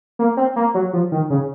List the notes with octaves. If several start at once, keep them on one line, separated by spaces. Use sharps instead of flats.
A#3
C4
A#3
F#3
F3
D#3
C#3